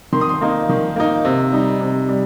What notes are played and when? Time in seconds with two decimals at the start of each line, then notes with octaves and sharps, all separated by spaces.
0.12 D#3 C6
0.21 D#6
0.29 C6
0.41 A#3 D#4
0.69 D#3
0.96 A#3 D#4
1.25 C3
1.52 G3 D#4
1.81 C3
2.09 G3